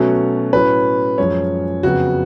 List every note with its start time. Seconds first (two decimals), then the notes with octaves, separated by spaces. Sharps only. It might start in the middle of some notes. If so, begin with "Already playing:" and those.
Already playing: B2 F#3 A3 C#4
0.53 A2 F#3 C#4 B4
1.18 F#2 F3 G#3 C#4 C#5
1.83 F2 C#3 F#3 B3 F#4